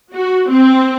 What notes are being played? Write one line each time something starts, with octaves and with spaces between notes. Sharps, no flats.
F#4
C4